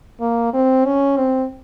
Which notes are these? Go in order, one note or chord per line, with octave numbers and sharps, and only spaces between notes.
A#3
C4
C#4
C4